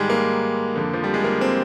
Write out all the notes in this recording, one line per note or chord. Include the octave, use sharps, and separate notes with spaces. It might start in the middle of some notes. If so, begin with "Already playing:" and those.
Already playing: G#2 D#3 G3 G#3
A#3
F2 D3
F3
G3
G#3
A#3
C4